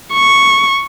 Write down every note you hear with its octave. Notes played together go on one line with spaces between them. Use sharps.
C#6